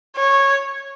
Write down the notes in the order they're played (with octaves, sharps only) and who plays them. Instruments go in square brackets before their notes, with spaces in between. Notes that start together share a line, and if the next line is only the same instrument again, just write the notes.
[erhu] C#5